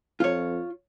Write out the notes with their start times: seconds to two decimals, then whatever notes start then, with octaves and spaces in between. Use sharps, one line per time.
0.20 F2 F4 C#5